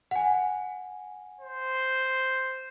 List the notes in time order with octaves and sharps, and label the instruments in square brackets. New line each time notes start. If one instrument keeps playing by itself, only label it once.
[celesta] F#5 G#5
[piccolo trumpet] C5